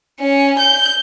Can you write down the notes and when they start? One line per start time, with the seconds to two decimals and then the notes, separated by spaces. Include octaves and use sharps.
0.20 C#4
0.59 G6